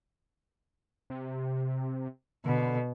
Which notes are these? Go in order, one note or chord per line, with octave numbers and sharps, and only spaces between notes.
C3
B2 D3